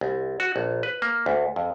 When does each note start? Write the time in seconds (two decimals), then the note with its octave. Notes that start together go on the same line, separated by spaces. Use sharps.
0.01 C2
0.40 F#4
0.56 A#1
0.83 B4
1.02 A#3
1.26 D2
1.56 F2